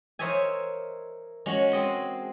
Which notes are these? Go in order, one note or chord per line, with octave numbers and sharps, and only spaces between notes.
A#4 C5 C#5 D#5 E5 G#5
G#3 C#4 F#4
G#3 C4 D#5 C6